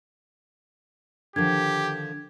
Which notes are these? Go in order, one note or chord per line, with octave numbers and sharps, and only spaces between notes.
D3 D#3 F3 D4 G4 G#6